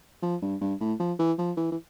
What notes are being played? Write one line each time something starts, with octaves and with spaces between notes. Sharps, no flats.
F3
G2
G2
A2
F3
E3
F3
E3
E3